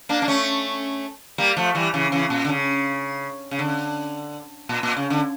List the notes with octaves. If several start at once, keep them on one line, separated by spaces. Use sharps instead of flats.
A#3 D4
D4
A3 C#4
G3 A#3
F3 A3
E3 G3
C#3 E3
C#3 E3
A#2
D3
C#3
C#3
D3
A#2
A#2
C#3
D3